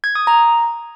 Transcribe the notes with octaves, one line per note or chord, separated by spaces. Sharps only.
G#6
D#6
A#5